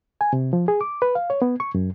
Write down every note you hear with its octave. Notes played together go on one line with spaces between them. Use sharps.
G#5
C3
F3
G#4
D6
B4
F5
C#5
B3
C#6
F#2